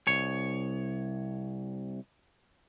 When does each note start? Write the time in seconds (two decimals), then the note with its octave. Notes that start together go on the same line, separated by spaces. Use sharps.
0.07 C2 C#5